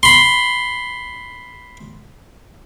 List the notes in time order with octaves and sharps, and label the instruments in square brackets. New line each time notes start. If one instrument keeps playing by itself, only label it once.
[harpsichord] B5 C6